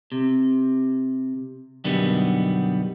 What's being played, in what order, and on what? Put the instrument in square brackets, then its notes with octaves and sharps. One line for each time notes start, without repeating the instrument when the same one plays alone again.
[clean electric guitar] C3
F#2 B2 D3 D#3 G3 B3